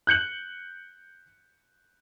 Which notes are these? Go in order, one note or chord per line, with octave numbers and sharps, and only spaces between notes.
F#6 G6 C#7 F#7